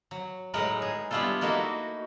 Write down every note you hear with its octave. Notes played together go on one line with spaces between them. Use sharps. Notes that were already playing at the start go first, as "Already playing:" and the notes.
F#3
A2 F#3 G#3 D#4 A#4 B4
G#4
G3 B3 D4 E4 F4 A4
A3 A#3 D#4 E4 F#4